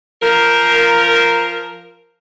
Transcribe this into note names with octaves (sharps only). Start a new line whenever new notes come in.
F3 A#4